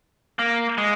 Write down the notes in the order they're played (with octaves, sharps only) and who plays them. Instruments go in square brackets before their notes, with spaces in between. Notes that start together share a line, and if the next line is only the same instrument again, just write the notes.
[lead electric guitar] A#3
G#3